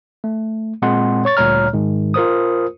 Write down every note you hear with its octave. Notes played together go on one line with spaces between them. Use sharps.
A3
A#2 G#3 C4 F#5 C6
C#5 C#6 A6
D2 A#2 G3 C#5 A#5 F6
G#2 D#3 G#3
F4 A#4 C5 D#6